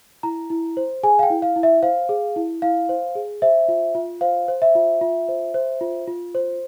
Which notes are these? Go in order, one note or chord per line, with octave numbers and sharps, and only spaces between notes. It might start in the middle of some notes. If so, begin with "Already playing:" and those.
E4 A#5
E4
C5
G#4 G#5
F5
G5
E4
F5
E4
E5
C5 F5
G#4
E4
E4 F5
C5
G#4
C5 E5
F4
F4
C5 F5
C5
E5
F4
F4
C5
C5
F4
F4
C5